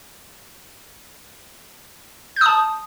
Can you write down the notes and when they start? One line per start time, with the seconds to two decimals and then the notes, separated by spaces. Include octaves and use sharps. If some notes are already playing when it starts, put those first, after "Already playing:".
2.36 G6
2.41 D#6
2.46 A5